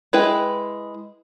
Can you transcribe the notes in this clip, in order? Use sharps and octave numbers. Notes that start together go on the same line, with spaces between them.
G#3 E4 B4 G5